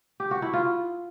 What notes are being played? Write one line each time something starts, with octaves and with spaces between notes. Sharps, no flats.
G4
F#4
E4
F4